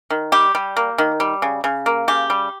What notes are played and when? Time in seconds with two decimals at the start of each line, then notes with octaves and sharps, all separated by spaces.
0.10 D#3
0.32 G3 G4
0.55 G3
0.77 A#3
0.98 D#3
1.20 G3
1.42 C#3
1.64 C#3
1.86 A#3
2.08 C#3 G4
2.30 G3